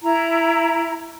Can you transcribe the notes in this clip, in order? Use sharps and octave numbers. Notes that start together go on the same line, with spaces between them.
E4 A#5